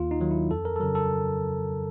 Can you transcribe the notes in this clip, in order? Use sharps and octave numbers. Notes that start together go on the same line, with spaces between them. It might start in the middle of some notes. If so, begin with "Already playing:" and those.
Already playing: D#2 F4
D#4
D#3 F#3
E4
F2 A4
A#4
A4
C#3 F#3 A#4
A4